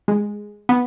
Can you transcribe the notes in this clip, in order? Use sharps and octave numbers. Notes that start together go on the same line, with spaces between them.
G#3
B3